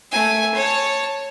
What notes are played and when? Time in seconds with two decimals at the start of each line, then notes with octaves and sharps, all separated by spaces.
0.12 A3 G#5
0.55 C#5 A5